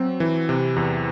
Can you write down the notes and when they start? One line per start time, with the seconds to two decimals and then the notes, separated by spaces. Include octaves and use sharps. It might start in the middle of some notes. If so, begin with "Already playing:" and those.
Already playing: F#3 C4
0.20 E3
0.49 C3
0.76 E2